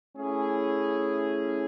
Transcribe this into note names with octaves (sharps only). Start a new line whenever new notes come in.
A3 C#4 E4 G#4